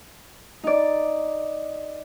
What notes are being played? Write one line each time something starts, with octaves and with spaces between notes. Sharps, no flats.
D#4 D5